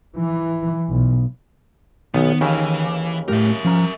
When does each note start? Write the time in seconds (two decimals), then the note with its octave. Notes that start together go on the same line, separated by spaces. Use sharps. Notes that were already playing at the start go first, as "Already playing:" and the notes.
0.17 E3
0.89 B1
2.14 B1 D#3 B3
2.41 D#2 C#3 E3
3.28 A2 A3 G4 A#4 E5
3.65 F3 C#4 A#5